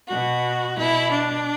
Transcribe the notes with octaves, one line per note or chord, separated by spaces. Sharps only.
B2 F#4
B2 E4
D4